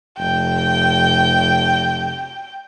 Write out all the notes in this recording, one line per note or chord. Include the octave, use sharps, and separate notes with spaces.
F1 G5